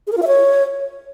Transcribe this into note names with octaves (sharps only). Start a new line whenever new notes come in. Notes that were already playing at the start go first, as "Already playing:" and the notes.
G#4
A#4
F4
E5
C#5